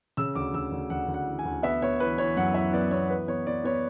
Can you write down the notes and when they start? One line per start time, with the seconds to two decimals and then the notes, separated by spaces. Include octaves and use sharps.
0.17 C#3 E6
0.35 D2 D6
0.54 D2 E6
0.72 D2
0.90 D2 F#5
1.08 D2
1.14 F#5
1.27 E3
1.39 G#5
1.45 D2
1.63 B3 E5
1.82 B3 C#5
2.00 E3 B4
2.18 E3 C#5
2.37 F#2 F#5
2.54 E3 E5
2.73 B3 D5
2.91 B3 C#5
3.10 E3 B4
3.28 B3 C#5
3.47 B3 D5
3.64 B3 C#5